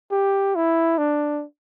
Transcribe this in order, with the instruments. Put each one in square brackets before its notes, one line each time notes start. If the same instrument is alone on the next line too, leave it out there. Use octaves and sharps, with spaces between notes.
[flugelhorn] G4
E4
D4